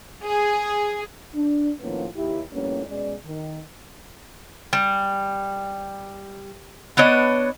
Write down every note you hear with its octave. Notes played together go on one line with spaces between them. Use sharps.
G#4
D4
A2 D#3 F3 A#3 B3 C#4
D#2 E4 G4
F2 A2 G3 A#3 B3 C#4
B2 G#3 C#4 D5
D#3
G3
B3 D4 C#5 D#5